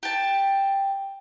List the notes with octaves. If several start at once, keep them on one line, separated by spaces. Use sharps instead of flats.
G4 A5